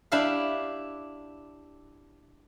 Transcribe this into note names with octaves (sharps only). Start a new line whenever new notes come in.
D4 E4 G4 E5 F5